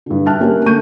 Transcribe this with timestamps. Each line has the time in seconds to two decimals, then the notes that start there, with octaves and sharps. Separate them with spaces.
0.06 G2 D3
0.26 E5 G5 A5 F6 F#6
0.40 A#3 C#4 G4 A#4
0.66 D3 A3 A#3 C#6 G6 D#7